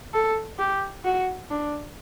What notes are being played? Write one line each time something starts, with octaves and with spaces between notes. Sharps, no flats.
A4
G4
F#4
D4